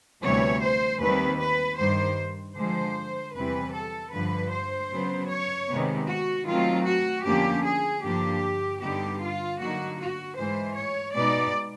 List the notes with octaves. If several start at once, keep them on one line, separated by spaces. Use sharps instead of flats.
D2 C3 E3 G3 B3 C#5
C5
D#2 D#3 G3 C4 B4
B4
G2 D#3 G3 C5
D3 F3 G#3 C5
E2 C3 E3 G3 C4 B4
A4
G2 D3 F3 B4
C5
C#3 F#3 B3
C#5
C3 D#3 G#3 B3
F#4
D#3 F#3 A3 C4 F4
F#4
F2 D3 F3 A#3 C#4 G4
G#4
G2 D3 F3 A#3 D4 G4
G2 D3 G3 B3 D#4 G4
F4
D3 F#3 A#3 D#4 F#4
F#4
G#2 E3 G#3 C5
C#5
B2 G#3 B3 D#4 D5